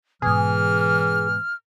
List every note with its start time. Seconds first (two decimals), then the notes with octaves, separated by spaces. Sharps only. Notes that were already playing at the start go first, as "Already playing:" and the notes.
0.22 G#2 B2 E3 G#4 F6